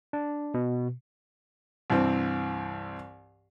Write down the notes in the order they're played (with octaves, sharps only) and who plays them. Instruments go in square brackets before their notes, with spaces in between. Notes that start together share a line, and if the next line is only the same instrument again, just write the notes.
[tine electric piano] D4
B2
[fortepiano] C2 G2 E3 C4